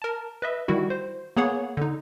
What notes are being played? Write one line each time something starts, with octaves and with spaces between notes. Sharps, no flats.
A#4 A5
B4 D#5 E5
D#3 G3 E4 F#4
C5
A#3 B3 G#4 C#5 F#5
D3 D#4